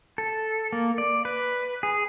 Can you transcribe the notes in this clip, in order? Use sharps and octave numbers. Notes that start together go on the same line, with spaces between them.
A4
A#3
D5
B4
G#4